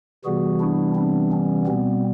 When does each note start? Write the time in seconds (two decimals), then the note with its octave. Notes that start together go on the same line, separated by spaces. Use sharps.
0.25 C3 E3 G3 B3 F#4 G#4
0.60 D4 E4
0.95 C4 D4
1.32 C#4
1.66 B2 G3 B3 C4